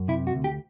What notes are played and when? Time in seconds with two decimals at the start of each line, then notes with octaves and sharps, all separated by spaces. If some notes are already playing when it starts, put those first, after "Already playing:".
Already playing: F#2
0.08 C3 E4
0.27 F#4
0.35 D2
0.44 G4